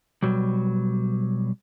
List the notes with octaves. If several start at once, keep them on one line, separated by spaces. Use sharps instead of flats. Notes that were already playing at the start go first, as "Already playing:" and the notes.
B2 F#3 G3